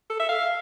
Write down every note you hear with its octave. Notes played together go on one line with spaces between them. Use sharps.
A4
E5
F5